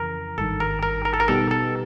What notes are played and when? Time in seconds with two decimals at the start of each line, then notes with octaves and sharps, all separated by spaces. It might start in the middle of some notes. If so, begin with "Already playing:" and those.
Already playing: F2 C#3 E3 A#4
0.38 G#1 G2 D#3 A4
0.60 A#4
0.83 A#4
1.05 A#4
1.14 A4
1.20 A#4
1.28 B2 G3 B3 D#4 G4 A4
1.51 A4